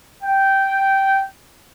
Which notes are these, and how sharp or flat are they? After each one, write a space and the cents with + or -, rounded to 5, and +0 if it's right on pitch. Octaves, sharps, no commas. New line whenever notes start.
G5 -10